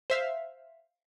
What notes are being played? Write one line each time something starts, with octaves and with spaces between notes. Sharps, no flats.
C5 E5 F5